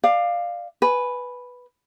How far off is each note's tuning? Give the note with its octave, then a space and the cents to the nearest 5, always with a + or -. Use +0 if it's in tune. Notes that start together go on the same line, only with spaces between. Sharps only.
D5 +25 F5 +0
B4 +0 G#5 +10